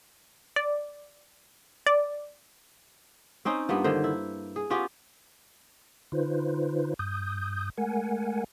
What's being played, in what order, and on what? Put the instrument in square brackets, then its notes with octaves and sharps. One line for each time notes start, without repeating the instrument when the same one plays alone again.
[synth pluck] D5
D5
[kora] C4 C#4 D#4 C5
G2 A#3 B3 F4
D3 D#3 C5
E4
G#4
B3 C#4 F4 G4
[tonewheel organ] D3 D#4 F4 B4 C5
G2 D#6 G6
G#3 A3 A#4 F#5 G#5